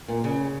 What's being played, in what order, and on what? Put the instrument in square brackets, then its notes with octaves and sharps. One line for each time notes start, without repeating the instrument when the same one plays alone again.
[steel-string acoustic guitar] A#2
C#3